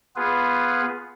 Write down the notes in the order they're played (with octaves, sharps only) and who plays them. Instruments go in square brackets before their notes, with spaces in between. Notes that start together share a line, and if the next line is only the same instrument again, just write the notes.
[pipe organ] B3 F4 G#4 B4